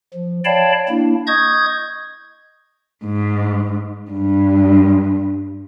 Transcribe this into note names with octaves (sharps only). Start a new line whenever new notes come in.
F3
C#5 D5 F5 G5 A5 B5
A#3 D4 E4
D#5 C#6 D#6 G6 G#6
G#2
G2